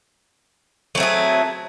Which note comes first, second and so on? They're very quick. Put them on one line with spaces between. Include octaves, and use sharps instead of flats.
F#3 C4 A3 G#4